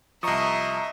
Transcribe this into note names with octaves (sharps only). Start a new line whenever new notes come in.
C2 F3 D#5 E5 A#5 C#6 D#6